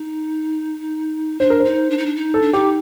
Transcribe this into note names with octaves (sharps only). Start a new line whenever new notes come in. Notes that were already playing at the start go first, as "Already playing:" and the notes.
Already playing: D#4
D4 C5
A#4
D#4 C5
D4
D#4
D4
D#4
A4
D4
D#4 G4